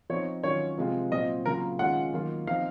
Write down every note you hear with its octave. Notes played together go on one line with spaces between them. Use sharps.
F3 C4 D#4 C#5
D#3 F#3 C#4 F4 C#5
C3 F3 G#3 C4 F4
A#2 F#3 C4 F4 D#5
C#3 F#3 A#3 F4 A#4
D#3 G#3 C#4 F4 F#5
D#3 F#3 A#3 F4
F3 C4 D#4 F5